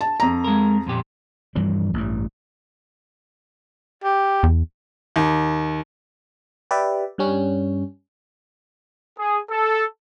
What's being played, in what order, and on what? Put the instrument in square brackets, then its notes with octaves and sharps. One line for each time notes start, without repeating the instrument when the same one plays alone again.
[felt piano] A5
F2 A#5
[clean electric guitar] G#3 A#4
F2 A#2 G4
[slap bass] G2 E3 F3 G3
A1 G2
[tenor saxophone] G4
[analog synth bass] E2
[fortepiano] D#2
[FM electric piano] G4 B4 D5 E5
G2 G3 C#4
[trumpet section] G#4
A4